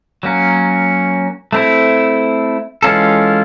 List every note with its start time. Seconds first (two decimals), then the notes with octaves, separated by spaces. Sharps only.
0.23 F#3 A#3 C#4
1.53 A3 C4 E4
2.83 E3 G#3 C#4 F4 A4